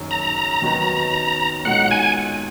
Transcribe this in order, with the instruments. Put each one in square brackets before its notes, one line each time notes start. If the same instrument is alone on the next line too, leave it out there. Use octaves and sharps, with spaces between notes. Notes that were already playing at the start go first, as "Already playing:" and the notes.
Already playing: [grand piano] F#1 F#2 D#3
[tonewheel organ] A#5
[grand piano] D#2 D#3 F#3 B3 D#4
[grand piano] B1 A#2 G#3 D#4 [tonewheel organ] F#5
[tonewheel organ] G#5